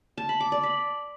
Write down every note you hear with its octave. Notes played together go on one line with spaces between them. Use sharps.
A5
B5
D6
D5
B5